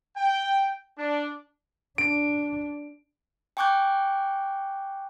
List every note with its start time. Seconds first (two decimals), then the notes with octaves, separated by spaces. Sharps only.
0.16 G5
0.97 D4
1.98 D4 D7
3.57 G5 G#5 C#6 D6 F#6 G6